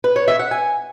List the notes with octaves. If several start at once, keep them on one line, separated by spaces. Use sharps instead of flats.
B4
C#5
E5
F#5
G#5